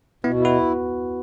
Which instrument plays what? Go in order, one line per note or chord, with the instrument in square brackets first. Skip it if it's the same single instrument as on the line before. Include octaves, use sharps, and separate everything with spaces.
[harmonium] B2 [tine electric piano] B3 E4
[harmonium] E4
[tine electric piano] F#4 B4